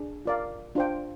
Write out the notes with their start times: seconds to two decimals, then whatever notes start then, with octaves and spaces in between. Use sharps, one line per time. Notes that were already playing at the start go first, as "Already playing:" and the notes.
Already playing: D4 G#4
0.25 F4 A#4 D5 F5
0.75 D4 F4 C5 G5